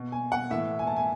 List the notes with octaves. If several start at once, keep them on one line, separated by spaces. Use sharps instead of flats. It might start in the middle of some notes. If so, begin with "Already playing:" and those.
Already playing: B2
G#5
F#5
A2 E3 E5
G#5
A5
G#5